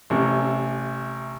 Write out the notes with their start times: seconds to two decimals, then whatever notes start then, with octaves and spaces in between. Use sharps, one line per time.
0.10 A1 C3